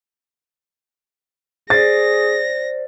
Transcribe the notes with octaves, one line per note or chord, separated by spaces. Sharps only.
G#4 C5 D5 A6 A#6